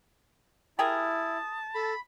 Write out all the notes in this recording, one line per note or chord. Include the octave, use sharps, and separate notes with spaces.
E4 G4 G#4 A#4 A5 D#6
A4 B5